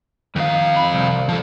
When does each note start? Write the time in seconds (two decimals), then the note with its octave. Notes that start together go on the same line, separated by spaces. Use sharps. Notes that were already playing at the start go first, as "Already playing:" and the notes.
0.36 F2 D#3 F5
0.76 B5
0.93 C2
1.29 F3 A4